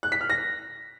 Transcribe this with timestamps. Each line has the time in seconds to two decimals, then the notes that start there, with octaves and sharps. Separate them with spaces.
0.03 F#6
0.12 B6
0.21 F6
0.30 A#6